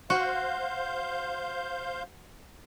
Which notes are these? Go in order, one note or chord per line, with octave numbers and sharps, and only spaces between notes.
F#4 C5 F5 G6